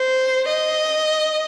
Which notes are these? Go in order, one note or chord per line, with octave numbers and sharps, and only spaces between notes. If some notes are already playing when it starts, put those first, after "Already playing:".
Already playing: C5
D#5